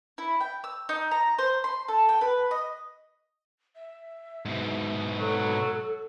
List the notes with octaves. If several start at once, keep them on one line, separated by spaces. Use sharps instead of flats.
E4
G5
E6
D#4
A#5
C5
C6
A4
G5
B4
D#5
E5
G#2 B2
F#3 A4